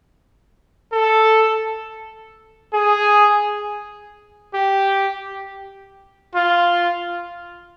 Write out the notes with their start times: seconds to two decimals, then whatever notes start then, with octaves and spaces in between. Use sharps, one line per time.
0.92 A4
2.73 G#4
4.54 G4
6.35 F4